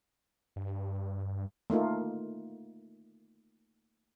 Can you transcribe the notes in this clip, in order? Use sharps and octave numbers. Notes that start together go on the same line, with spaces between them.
G2
A3 A#3 D#4 F4